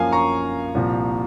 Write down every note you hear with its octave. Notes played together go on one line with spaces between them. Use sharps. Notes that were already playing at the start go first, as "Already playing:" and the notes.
Already playing: F#2 F3 A#3 C#4 F5 G#5
A#5 C#6
C2 A#2 F3